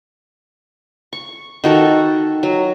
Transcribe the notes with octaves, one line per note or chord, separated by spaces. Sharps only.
C#6
D#3 F#4 A4
F#3